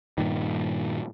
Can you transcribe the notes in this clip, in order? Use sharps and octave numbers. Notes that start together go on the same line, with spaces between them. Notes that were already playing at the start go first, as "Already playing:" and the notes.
G2 A#2 D#3